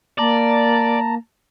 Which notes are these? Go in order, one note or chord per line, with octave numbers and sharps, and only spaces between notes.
A#3 D5 A5 A#5